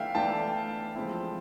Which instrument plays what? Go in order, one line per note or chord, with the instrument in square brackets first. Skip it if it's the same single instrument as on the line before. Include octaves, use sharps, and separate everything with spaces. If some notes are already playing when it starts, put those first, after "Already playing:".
Already playing: [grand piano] E3 A3 D4 E5 F5 G5
E3 A3 D4 G5 A5
F3 G#3 C4 E4